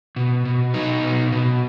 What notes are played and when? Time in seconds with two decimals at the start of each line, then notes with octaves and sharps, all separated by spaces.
0.16 B2
0.45 B2
0.74 F#3 D#4
1.03 B2
1.32 B2